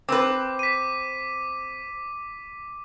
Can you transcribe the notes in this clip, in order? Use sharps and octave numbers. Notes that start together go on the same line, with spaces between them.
C4 B4 D6
B6 D#7